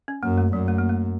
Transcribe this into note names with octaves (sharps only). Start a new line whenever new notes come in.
C#4
F#2 A#3
A3
F#2 F#3
A3
A#3
A3